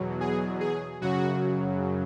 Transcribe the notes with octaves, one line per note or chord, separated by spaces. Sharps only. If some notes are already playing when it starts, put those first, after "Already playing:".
Already playing: E2 B2 F#3
G#4
G#4
F#2 C#3 F#3 F#4